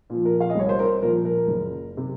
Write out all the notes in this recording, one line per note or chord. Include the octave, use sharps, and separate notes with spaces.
A#2 F3
A#4
F5
D#5
C2 C#5
C5
A#4
A#2 F3 A#4
A#4
F#1
C3